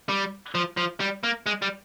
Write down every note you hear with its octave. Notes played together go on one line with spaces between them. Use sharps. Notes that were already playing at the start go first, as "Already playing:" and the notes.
G3
F3
F3
G3
A#3
G#3
G3